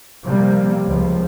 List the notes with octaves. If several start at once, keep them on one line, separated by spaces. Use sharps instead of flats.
C3 F3 G3 A#3
C#2 F3